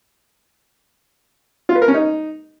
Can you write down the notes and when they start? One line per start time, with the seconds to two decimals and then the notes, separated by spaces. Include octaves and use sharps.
1.69 F4
1.75 B4
1.82 A#4
1.88 C#4
1.94 D#4